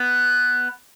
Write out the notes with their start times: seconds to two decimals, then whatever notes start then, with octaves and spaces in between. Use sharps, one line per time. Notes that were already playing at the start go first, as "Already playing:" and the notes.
Already playing: B3